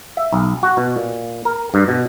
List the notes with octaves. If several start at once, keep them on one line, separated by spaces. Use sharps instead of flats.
E5
B1
F#4
B2
A#2
A#4
G2
B2